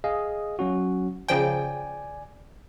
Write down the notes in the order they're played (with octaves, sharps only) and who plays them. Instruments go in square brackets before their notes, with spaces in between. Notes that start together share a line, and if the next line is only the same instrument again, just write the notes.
[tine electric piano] G#4 D#5 F5
F#3 C#4 F#4
[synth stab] C#3 F3 G5 [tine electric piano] D5 G#5